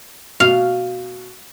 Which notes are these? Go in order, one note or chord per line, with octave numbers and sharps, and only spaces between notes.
B2 F5